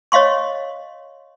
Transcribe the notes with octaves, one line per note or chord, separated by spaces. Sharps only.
C#5 D#5 F5 C6 C#6